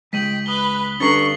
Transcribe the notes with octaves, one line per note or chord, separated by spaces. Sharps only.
C#2 G#3 G5 B6 D#7 F#7
B4 D#6 G7
G2 D3 C#4 A#5 C#6 A6 C7 F#7